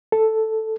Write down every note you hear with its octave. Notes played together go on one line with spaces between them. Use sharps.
A4